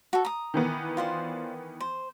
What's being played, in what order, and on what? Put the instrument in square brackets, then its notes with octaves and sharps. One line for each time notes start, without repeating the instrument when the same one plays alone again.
[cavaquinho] F#4 A4
A#5 D#6
[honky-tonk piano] D#3 E3 B3
[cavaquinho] F4 C5 D5
C5